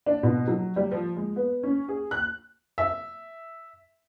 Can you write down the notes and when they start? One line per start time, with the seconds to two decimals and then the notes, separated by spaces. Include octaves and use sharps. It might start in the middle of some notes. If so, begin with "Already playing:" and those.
0.06 D4
0.23 B2
0.48 F#3
0.76 G3
0.92 F3
1.16 G#3
1.36 B3
1.63 C#4
1.89 G#4
2.11 F#6
2.78 E5